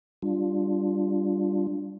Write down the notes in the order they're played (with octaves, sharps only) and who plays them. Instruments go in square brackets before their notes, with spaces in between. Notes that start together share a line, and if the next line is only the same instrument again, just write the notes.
[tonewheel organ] G3 D4 F4